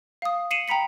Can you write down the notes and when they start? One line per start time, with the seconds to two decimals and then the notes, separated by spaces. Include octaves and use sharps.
0.22 F5 D#6
0.51 C7 C#7 D#7 E7 F#7
0.68 G5 A#5 B5 B6 C#7